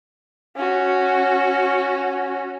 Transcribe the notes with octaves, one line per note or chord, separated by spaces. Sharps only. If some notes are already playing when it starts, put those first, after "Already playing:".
C#4 F#4